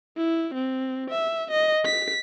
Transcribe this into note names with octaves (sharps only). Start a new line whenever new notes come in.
E4
C4
E5
D#5
B6